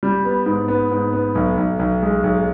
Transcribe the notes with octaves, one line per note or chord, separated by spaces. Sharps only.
G3
B3
G#2
B3
G#2
B3
B1
B1
B1
G#3
B1